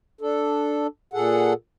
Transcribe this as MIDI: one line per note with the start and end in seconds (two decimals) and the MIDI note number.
0.21 0.87 62
0.21 0.87 69
1.13 1.53 46
1.13 1.53 68
1.13 1.53 69
1.13 1.53 78